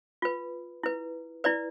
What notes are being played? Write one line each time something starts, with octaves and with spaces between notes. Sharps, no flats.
F4 B4
E4 B4
E4 B4 D5